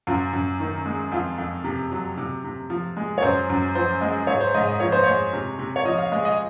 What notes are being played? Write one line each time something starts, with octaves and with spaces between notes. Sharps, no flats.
F#2 F4
F#2
D#3
G#3
F2 F4
F2
C3
F#3
C3
C3
F3
G#3
C#5
F#2 C5
F#2
F3 C5
G#3 D#5
G#2 C#5
C5
G#2 D#5
D#5
F3 C#5
C5
G#3 C#5
C3
C3
C#5
F3 D#5
F5
G#3 D#5
D#5